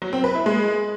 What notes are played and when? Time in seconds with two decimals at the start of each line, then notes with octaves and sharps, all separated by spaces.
0.02 F#3
0.13 C4
0.24 B4
0.35 E4
0.46 G#3